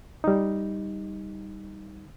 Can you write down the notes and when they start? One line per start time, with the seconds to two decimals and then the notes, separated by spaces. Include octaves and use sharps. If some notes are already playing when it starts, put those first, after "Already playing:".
0.24 G3 D#4